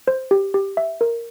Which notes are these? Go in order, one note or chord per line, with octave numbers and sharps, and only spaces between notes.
C5
G4
G4
E5
A#4